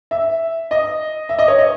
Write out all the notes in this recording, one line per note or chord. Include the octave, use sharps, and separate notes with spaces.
E5
D#5
E5
D#5
C#5
D#5